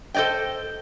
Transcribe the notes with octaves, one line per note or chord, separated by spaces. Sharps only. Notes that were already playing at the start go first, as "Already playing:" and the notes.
A4 C5 D5 D#5 G5